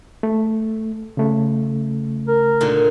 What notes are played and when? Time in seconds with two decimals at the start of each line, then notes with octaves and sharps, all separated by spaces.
0.23 A3
1.17 C#3 A3
2.28 A#4
2.60 A#2 D3 D#4